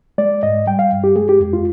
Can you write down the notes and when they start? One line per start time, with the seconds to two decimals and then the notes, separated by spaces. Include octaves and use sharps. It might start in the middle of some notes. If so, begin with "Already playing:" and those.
0.18 G#3 D5
0.43 G#2 D#5
0.67 G3 G5
0.79 F5
0.92 G2
1.04 G4
1.16 G#3 G#4
1.29 G4
1.40 F2
1.53 F4